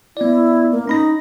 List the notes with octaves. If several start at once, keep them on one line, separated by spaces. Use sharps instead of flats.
B3 E4 D5
A#3
C#4 D#4 B5 A#6